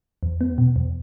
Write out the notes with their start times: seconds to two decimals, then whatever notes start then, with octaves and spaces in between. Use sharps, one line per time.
0.23 E2
0.41 B3
0.58 B2
0.76 E2